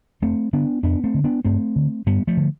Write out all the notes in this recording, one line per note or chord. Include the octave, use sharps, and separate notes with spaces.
F2 A3 C4
D3 B3 D4
F2 B3 D4
A3 C4
D3
B3 D4
G2 A3 C4
D3
G2 G3 B3
F3 A3
D3